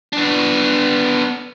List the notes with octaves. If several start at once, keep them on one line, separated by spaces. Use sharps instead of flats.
B3 D4